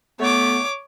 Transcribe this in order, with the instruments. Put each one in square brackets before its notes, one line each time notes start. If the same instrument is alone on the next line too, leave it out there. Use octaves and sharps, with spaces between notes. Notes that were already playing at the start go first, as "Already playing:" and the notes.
[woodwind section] A3 B3 [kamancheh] C#5 D6